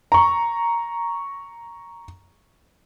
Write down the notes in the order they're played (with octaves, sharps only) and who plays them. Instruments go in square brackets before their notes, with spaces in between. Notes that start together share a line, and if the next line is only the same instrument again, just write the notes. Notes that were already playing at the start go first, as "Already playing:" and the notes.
[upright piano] A#5 C#6